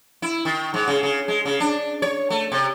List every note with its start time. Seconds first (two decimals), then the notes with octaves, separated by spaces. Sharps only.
0.22 E4
0.45 D#3
0.74 G#2
0.88 C#3
1.03 C#3
1.28 G#3
1.46 C#3
1.60 D4
2.02 C#5
2.30 A3
2.52 C3